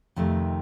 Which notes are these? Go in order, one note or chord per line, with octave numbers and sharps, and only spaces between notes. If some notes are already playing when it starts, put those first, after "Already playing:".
F2 C3 D#3 A3